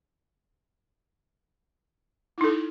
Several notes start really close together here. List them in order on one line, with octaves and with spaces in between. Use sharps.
E4 D#4 A4